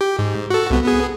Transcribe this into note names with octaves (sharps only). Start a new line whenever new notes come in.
G4
G#2
F#4 A4
C2 B3
B3 G#4